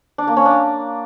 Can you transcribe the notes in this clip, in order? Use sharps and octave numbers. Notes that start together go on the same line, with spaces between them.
D4
A#3
C#4
D4